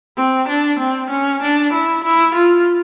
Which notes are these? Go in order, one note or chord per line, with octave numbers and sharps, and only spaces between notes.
C4
D4
C4
C#4
D4
E4
E4
F4